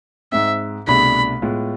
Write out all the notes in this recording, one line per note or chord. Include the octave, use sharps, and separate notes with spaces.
G#2 G#3 C4 E5
C2 B2 A3 D4 G#4 B5
A2 G#3 B3 F4